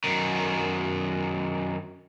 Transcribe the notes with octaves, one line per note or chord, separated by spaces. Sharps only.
F#2 D#3